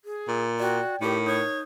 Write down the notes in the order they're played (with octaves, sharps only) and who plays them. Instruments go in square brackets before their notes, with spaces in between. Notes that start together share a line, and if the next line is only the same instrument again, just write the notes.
[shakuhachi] G#4
[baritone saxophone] A#2
[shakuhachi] F#4 [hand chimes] D5 G5
[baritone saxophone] A2 [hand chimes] D#4 A#4 [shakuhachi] G4
[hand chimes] D#4 D#6 G6 [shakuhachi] C#5